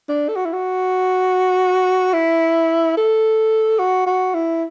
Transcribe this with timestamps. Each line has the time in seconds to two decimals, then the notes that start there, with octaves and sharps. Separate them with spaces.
0.08 D4
0.28 A4
0.36 F#4
0.45 E4
0.53 F#4
2.13 E4
2.97 A4
3.79 F#4
4.06 F#4
4.34 E4